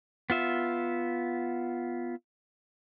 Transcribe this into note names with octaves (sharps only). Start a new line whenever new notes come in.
B3 F4 E5